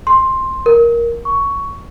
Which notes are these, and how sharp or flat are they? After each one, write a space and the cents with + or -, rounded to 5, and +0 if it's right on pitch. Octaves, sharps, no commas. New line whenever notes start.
C6 +10
A#4 +10
C#6 +10